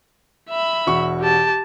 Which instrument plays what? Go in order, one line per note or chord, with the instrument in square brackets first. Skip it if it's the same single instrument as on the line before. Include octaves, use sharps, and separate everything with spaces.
[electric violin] E5 B5
[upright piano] E1 F#4 C#6
[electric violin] G4 A5